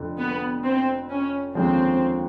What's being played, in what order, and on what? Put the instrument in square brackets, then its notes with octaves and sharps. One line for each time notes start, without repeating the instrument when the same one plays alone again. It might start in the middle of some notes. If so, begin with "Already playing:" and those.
Already playing: [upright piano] F1 F2 D3
[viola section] B3
C4
C#4
[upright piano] D#2 D3 F3 G#3 C#4 [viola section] C4